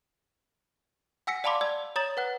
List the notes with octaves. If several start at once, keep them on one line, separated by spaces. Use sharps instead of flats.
F#5 G#5 E6 A#6 B6 C#7
D5 F5 A5 B5 C6 D6
D5 E6 G#6
C#5 A#5 D#6 A6 E7 F#7
B4 F#5 F#6